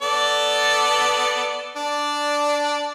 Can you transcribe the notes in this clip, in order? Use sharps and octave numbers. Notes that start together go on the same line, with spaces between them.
B3 A4 D5
D4 D5